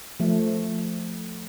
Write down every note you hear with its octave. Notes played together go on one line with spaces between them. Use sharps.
F3 A3